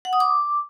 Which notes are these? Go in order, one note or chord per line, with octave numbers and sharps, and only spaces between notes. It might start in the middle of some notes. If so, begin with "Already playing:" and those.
F#5
D#6
D6